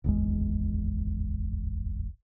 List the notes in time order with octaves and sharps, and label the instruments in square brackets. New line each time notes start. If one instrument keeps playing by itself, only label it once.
[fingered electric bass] D1 G#1 E2 G#3